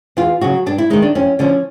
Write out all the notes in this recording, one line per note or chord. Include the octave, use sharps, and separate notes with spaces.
E2 F4
C#3 F#3 F#4
G2 D4
E4
D#3 G#3 D#4
D4
F2 C#4
D3 F3 C#4